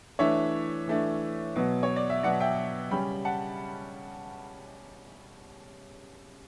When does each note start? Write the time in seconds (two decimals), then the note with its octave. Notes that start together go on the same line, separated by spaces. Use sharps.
0.19 E3 A3 D4 C#5 E5
0.87 E3 A3 D4
1.56 B2 F#3 B3
1.83 C#5
1.96 D5
2.10 E5
2.23 B2 F#3 B3 D5 F#5
2.40 E5 G5
2.91 C#3 G3 C#4 G5 B5
3.25 F#5 A5